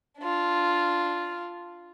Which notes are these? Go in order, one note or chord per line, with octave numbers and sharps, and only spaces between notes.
D4 F4